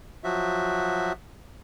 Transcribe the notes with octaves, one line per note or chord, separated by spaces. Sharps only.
F3 F#3 F#4 E5